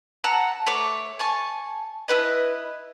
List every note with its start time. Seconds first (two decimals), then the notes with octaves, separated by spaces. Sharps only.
0.24 F#5 A5 A#5 E6
0.67 A3 C#5 D6
1.19 G#5 A5 C#6
2.08 E4 F4 B4 D#5